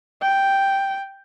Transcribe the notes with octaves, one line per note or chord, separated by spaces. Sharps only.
G5